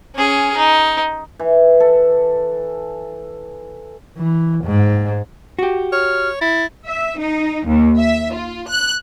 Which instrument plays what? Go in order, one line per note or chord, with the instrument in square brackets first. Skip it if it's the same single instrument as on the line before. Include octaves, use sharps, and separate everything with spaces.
[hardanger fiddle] C#4 G#4
D#4
[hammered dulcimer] E3
A4
[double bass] E3
G#2
[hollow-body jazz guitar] F#4 G4
[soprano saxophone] C#5 [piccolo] F6
[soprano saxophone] E4 [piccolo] A6
[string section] E5
D#4
D#2
E5
F4
F#6